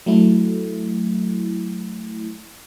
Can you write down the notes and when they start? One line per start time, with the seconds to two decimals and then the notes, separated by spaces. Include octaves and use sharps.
0.06 F#3 A3 E4